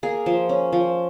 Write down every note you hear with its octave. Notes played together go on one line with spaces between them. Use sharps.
A#3 G#4
F3
C#4
F3